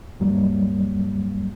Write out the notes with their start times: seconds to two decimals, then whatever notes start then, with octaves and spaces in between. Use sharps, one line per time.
0.20 D2 G2 F#3 G3 A#3